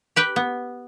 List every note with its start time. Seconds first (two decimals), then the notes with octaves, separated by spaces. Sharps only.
0.16 G4 B4 G5
0.36 B3